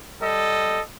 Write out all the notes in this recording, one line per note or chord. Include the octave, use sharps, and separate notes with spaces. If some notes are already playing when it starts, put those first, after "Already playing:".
G3 A4 D#5